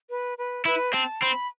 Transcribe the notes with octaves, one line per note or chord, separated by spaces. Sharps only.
B4
B4
E4 B4
C4 A5
C4 B5